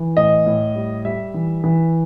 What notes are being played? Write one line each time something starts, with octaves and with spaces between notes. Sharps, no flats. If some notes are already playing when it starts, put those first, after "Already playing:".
Already playing: E3
A2 D#5
A2
G3
G3 E5
E3
E3